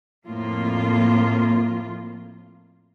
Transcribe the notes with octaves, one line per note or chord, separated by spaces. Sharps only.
F2 A2 A#3 F4